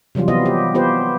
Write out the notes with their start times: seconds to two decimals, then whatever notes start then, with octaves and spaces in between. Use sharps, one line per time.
0.15 C3 E3 F#3 G3 F4
0.28 C3 F3 B3 F4 D#5
0.46 G4
0.75 B3 F4 G4 B4 C5